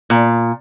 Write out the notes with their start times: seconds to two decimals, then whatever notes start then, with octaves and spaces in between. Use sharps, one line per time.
0.10 A#2